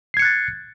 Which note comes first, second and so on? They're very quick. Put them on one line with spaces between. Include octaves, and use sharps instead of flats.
C7 G#6 C#7 F#6 A6